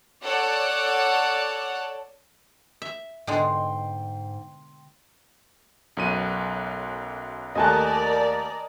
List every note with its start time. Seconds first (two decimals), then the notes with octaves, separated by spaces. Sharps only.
0.23 A4 C#5 D5 F#5
2.82 E5
3.27 G#2 B2 D3 G#3 G5 C6
5.97 B1 F#2 D#7
7.55 D#2 A3 A#4 D5 D#5 G#5 A5 F#6